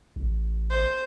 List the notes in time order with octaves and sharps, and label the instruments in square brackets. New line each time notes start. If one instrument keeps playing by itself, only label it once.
[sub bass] A1
[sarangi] C5